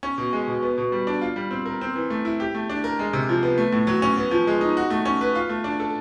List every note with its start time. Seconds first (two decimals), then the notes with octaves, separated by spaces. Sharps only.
0.03 C#4
0.18 B2
0.33 G#3
0.47 B2
0.63 B3
0.78 B2
0.92 G3
1.07 D4
1.21 F4
1.36 G3
1.51 C4
1.66 A#4
1.81 C4
1.95 E3
2.10 A3
2.25 E4
2.40 G4
2.55 A3
2.70 D4
2.84 A#4
2.99 G#3
3.13 C3
3.29 F3
3.43 B3
3.58 A3
3.72 A2
3.87 F#3
4.02 C#4
4.18 B3
4.31 F3
4.47 G#3
4.61 D#4
4.77 F#4
4.90 A3
5.05 C#4
5.21 B4
5.35 F4
5.49 A3
5.64 D4
5.80 A4